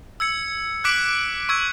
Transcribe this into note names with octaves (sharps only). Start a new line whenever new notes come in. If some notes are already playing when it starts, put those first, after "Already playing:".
E6 G#6 C#7
D6 F#6 B6 D7 F#7
C#6 E6 G#6